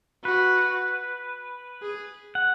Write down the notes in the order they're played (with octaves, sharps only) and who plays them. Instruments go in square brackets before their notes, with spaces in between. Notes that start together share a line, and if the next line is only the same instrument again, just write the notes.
[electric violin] F#4 [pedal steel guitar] B4
[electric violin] G#4
[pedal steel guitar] F#5